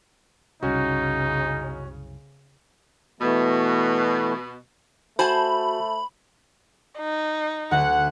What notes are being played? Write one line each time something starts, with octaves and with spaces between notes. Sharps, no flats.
C2 F#2 C#3 C#4 D#4 F#4
B2 E3 A3 B3
A3 F#4 C5 G#5 A5 B5
D#4
D2 F#5